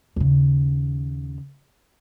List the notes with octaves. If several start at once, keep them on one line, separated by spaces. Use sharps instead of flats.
D#2 C#3